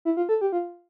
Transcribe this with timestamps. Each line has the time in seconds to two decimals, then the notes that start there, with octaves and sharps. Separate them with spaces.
0.05 E4
0.17 F4
0.29 A4
0.41 G4
0.52 F4